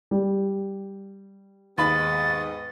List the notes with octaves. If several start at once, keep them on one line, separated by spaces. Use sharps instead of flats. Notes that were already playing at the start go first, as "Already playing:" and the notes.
G3
D#2 G#2 B3 D#5 B5 A6